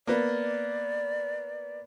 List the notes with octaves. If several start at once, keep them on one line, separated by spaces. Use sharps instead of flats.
A#3 B3 D5